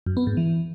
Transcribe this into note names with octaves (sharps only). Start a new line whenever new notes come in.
F#2
B3
G#2
E3